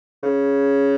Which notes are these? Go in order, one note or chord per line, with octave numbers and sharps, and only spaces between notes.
C#3